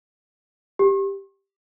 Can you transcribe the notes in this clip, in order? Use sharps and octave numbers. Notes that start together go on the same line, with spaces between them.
G4